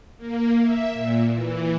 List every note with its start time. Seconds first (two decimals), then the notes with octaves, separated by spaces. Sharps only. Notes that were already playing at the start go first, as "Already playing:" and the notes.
0.17 A#3
0.61 E5
0.93 A#2
1.34 E3